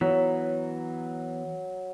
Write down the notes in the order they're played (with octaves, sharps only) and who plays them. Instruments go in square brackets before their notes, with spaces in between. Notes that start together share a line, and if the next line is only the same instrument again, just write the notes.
[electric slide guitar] E3 B3 [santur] F#3